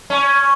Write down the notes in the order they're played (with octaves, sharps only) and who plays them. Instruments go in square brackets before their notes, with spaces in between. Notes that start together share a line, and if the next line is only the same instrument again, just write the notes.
[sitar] C#4